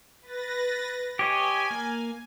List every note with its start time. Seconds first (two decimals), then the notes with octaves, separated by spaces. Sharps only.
0.22 B4 A6 A#6
1.19 G4 C#5 D#5 G#5
1.70 A#3